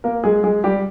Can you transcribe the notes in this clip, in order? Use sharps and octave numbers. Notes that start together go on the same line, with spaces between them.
A#3 A#4
G#3 G#4
G#3 G#4
G3 G4